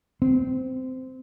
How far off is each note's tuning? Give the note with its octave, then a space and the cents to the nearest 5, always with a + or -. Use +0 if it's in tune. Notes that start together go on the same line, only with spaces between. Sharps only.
C4 -20